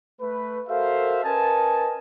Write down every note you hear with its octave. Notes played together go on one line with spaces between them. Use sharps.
A3 B4
F#4 A4 A#4 C5 E5 F5
C#4 A#4 B4 D#5 G#5 A5